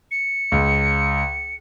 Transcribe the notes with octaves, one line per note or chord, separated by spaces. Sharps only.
C#7
C#2